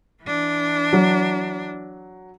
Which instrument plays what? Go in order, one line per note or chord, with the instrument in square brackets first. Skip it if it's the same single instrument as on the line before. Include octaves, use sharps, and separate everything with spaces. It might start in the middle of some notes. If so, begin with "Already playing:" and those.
[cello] E3 D4
[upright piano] F#3